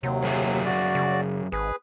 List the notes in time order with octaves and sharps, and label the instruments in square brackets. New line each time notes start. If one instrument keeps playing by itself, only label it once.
[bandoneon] D#2 F#3 [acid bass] C3
[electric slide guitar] F#2 G#4 E5
[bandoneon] F#4 D5
[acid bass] C#3
[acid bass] G#1 [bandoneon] G#4 B4